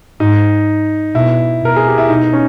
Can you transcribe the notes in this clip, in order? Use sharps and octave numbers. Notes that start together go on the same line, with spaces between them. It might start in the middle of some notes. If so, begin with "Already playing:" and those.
G#2 D#4
B2 E4
B2 A#4
G#4
G4
E4
B2 D#4
C#4